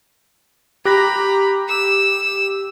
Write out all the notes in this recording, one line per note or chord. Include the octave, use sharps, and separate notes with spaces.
G4 A#5 B5 F#6 A#6
E6